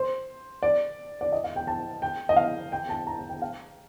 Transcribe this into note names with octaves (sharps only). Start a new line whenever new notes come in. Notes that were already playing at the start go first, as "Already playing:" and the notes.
Already playing: C5
D5
D5
D#5
F5
G5
A5
G5
D#5
F5
G5
A5
A#5
A5
G5
F5